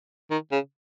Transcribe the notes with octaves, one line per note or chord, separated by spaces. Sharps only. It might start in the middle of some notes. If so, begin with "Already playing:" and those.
D#3
C#3